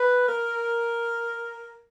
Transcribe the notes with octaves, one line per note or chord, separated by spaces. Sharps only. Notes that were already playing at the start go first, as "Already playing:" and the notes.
Already playing: B4
A#4